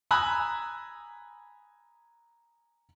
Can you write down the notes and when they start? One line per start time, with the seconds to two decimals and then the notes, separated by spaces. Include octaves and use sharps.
0.11 G#5 A#5 B5 D#6 E6 F#6